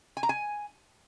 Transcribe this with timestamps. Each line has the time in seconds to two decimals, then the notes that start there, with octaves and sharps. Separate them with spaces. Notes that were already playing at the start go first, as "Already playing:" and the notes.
0.17 G#5
0.23 A#5
0.29 G#5